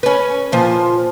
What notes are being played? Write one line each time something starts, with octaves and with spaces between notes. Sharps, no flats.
C#4 B4
A#2 F3